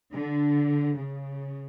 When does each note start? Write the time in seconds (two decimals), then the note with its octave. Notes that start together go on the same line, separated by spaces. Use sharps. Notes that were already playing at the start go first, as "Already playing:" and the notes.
0.14 D3
0.98 C#3